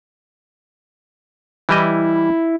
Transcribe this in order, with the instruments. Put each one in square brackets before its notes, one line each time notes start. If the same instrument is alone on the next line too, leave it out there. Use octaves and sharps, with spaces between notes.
[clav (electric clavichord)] E3 G3 D#5 [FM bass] E4